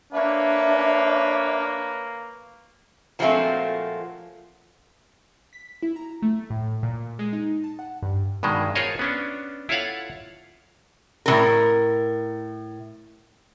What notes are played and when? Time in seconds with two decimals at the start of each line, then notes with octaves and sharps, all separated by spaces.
0.13 A#3 D4 B4 C#5 E5
3.19 A#2 F3 F#3 G#3 A3 C4
5.53 B6
5.83 E4
5.96 A#5
6.22 A3
6.50 A2
6.83 A#2
7.19 G#3
7.33 D#4
7.64 A5
7.79 F#5
8.03 G2
8.43 G2 B2 D#3 G#3
8.75 F4 G#4 A#4 C5 C#5 D#5
8.99 B3 C#4 D4
9.69 E4 F4 A4 C#5 F5 F#5
11.26 A2 E3 A#4